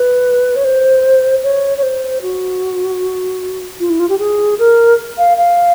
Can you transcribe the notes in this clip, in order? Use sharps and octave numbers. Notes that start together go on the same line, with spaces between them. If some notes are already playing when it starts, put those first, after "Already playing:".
Already playing: B4
C#5
C5
C#5
C#5
C5
F#4
F4
E4
F4
G4
G#4
A#4
F5
F5